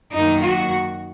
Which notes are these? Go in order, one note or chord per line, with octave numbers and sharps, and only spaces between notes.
F#2 D#3 A#3 D#4
F#4